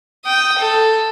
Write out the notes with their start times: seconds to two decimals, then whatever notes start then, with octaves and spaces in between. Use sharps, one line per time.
0.24 G5 D#6
0.59 A4